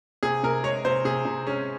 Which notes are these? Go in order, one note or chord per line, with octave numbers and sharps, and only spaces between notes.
C3 G#4
C3 A#4
G#3 C#5
C3 C5
C3 G#4
C3
G#3 C#4